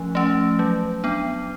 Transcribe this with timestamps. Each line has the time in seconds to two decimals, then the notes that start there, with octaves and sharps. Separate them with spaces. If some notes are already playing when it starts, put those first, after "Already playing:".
Already playing: F3 A3 C#4
0.15 A3 C#4
0.59 F#3
1.04 B3 D4